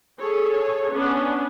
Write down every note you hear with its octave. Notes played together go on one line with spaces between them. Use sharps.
G#4 A4 C#5
B3 C#4 D4